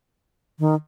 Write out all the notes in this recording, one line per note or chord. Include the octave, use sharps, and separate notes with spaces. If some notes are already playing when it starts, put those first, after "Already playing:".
D#3